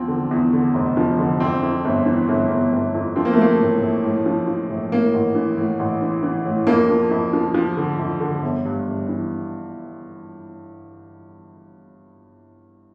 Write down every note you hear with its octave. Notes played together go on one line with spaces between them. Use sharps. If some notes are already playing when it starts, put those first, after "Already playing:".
Already playing: E2 F3 C4
D3
E2
D3
F1
F3
D3
F2 C4
F2
G1
E3
G1
G1
G1
F2
F3 C4
A#3
A3
F3 A#3
A2
A#1
A2
F3
F3
A#1
A2 A#3
A1
E3
A2
A1
E3
E3
A2
F2 A#3
F3
F2
F3
F3
D3
F2
D3
G1
G2
G1
E3